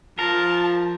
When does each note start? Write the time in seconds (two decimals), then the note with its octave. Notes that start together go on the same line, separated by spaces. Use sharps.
0.19 F3 A#4 A5